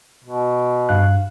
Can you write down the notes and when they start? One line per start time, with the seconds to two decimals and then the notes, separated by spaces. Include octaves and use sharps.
0.24 B2
0.89 G2 F5 F#6